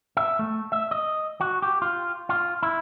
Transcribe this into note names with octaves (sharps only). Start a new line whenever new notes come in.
E5
A3
E5
D#5
F#4
G4
F4
F4
E4